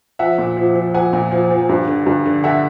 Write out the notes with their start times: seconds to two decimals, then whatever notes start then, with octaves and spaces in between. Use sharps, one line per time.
0.19 F3 E5 F#5
0.38 A#2
0.57 F3
0.75 F3
0.94 F3 F#5 G#5
1.13 A#2
1.32 F3
1.51 F3
1.69 G2
1.87 D3
2.06 G2
2.26 D3
2.44 D3 E5 F#5